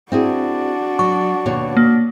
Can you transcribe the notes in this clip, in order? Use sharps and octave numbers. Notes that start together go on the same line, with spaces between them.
C4 D4 E4 F#4 G#4
F#3 C#6
D#2 B2 C#5
A#3